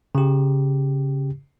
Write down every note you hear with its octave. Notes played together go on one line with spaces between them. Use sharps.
C#3 G4